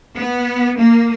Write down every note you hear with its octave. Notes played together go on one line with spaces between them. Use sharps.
B3
A#3